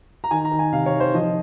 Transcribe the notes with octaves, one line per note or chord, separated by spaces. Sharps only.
A#5
D#3 G#5
A#5
D#3
G#5
C3 F5
C#5
D#3
C5
F3 D#5